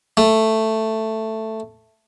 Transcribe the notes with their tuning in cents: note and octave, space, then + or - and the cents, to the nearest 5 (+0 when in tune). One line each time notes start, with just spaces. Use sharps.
A3 +5